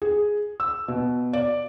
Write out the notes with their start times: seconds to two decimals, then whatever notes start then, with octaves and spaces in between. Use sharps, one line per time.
0.02 G#4
0.60 E6
0.88 B2
1.33 D5